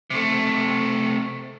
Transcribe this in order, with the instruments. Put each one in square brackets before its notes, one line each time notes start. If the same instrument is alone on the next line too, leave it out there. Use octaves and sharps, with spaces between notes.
[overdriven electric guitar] C3 A3